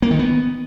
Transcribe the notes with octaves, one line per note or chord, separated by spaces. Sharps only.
A#3
D#3
B3